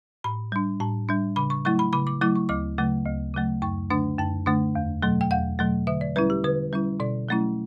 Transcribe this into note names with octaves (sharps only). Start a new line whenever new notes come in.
A2 B5
G3 D4
A2 A5
G3 D4
C#3 B5
C#6
F#3 A3 E4 C#6
B5
C#3 B5
D6
F#3 A3 E4 D6
C#6
D2 D6
C#3 F#3 A3
D2
C#3 F#3 A3
F#2 C#6
D3 A3 D4
F#2 A5
D3 A3 D4
E2
B2 F#3 A3
G5
E2 F#5
B2 F#3 A3
D3 E5
D5
G3 C#4 E4 B4
G4
D3 B4
G3 C#4 E4
B2 D5
F#3 A3 C#4 E4